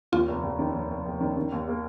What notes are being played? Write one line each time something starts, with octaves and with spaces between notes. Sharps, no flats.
D#2 F4
F1
F1
D#3
D#2
F1
F1
D#3
D#3
D#2
A#3